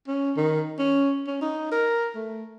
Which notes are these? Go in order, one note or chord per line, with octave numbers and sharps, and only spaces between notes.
C#4
D#3
C#4
C#4
D#4
A#4
A3